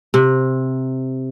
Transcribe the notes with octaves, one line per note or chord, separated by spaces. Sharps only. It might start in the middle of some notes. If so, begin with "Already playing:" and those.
C3